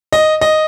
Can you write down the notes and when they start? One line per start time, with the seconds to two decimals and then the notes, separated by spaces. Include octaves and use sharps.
0.13 D#5
0.41 D#5